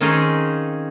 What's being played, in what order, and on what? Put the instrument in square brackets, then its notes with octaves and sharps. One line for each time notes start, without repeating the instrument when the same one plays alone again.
[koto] D#3 C4 C#4 D#4 F4 G#4